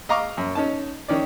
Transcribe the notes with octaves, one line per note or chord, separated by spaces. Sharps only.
D#5 F5 A#5 C#6 D6
F#2
C#4 D#4 A5
D#3 C#4 D5